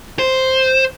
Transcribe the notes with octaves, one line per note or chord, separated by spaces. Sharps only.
C5